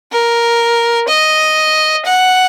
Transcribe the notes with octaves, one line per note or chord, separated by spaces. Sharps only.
A#4
D#5
F#5